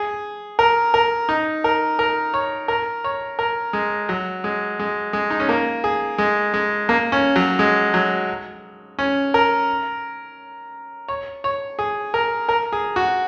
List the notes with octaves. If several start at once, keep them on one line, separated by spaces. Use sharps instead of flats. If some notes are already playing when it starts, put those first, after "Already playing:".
Already playing: G#4
A#4
A#4
D#4
A#4
A#4
C#5
A#4
C#5
A#4
G#3
F#3
G#3
G#3
G#3
D#4
C#4
A#3
G#4
G#3
G#3
A#3
C#4
F#3
G#3
F#3
C#4
A#4
C#5
C#5
G#4
A#4
A#4
G#4
F#4